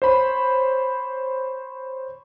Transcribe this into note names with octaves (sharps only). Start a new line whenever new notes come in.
C5 C#5 B5